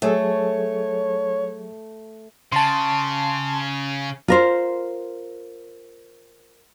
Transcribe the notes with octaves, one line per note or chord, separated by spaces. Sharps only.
F#3 A3 G#4 A4 C#5
C#3 A5 C6
F4 A#4 C5